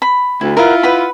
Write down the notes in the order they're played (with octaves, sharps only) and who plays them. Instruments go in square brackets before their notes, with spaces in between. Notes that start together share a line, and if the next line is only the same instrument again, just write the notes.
[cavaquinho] B5
[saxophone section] D2 [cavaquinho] E4
[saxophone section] E4 F4 [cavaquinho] A#4 F#5
[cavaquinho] B4 F#5 B5